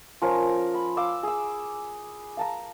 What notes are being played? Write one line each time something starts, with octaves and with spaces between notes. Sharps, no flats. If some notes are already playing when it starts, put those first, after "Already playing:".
F3 C#4 A#4
B5
F5 D6 E6
G#4 E6
F5 A5 A#5